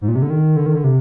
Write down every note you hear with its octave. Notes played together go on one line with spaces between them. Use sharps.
G#2
A#2
C3
D3
D#3
D3
D#3
D3
C3